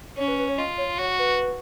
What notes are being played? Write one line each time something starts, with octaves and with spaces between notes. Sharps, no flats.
C#4 C#5
B4
B4
C#5
F4 D#5
C#5
F#4 C#5
B4